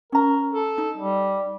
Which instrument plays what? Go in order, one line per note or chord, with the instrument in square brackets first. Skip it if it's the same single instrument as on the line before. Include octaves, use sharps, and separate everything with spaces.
[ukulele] C#4 A#5 [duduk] A#4
[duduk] A4
[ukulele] D#4
[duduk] G3